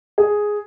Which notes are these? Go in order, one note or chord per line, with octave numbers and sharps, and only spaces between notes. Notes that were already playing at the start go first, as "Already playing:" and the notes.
G#4